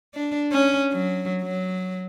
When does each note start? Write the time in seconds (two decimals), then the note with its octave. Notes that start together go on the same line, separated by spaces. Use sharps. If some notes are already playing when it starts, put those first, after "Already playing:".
0.14 D4
0.52 C#4
0.92 F#3
1.42 F#3